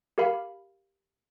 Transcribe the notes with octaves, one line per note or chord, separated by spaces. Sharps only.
G4 A#4 F5 B5